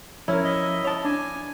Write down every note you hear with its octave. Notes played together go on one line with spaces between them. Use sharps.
F3 C#4 E4 A#4
D#5 E5
C#5 A5
D4 G#5